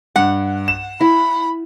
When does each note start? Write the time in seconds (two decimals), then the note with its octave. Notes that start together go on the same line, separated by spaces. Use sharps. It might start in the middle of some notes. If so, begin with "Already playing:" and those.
0.16 G2 F#5
0.68 E7
1.01 E4 B5